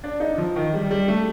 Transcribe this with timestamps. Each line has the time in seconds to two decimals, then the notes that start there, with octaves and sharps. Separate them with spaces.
0.04 D4
0.20 D#4
0.38 F3
0.56 D#3
0.74 G3
0.91 G3
1.08 A3